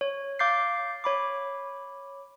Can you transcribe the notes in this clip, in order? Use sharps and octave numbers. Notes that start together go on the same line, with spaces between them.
C#5
F5 D6 G6 A6 C7
C#5 B5 D6